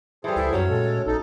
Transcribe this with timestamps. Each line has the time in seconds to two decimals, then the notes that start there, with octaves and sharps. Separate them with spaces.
0.24 E3 G3 G#4 A4 C5
0.36 C#2 E4
0.53 F#2 F#3 A3 C#4 C#5
0.70 A#2 G#3 A4
1.06 A1 D#4 A4